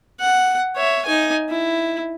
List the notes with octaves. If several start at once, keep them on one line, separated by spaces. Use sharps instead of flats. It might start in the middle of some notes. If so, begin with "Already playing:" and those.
F#5
C#5 E5
D#4 G#5
E4